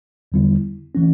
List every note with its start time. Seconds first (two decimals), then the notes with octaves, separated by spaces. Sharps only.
0.32 E2 D3 G3 B3 E4
0.95 E3 A3 C#4